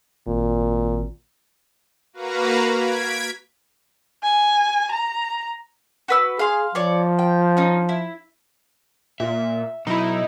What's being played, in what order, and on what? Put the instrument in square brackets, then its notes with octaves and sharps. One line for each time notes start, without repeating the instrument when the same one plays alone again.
[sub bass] G#1 [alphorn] A#2
[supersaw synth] A#3 F#4 B4 F5 A#5
G#6 B6 D7
[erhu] G#5
A#5
[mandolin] F#4 B4 E6
[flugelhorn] G#4 [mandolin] F5 C6
[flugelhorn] F3 [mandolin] C#5 D5 C#6
[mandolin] G5
C#4 D#4
E4
[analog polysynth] A#2 [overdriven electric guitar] E5
[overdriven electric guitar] B2 F#3 [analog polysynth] D#4 E4